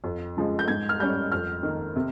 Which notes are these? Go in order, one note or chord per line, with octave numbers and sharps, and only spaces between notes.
F2
C#3 F3 G#3
G6
G#2 G#6
F6
G3 C#4 G6
F2 F6
D#3
A#3
C3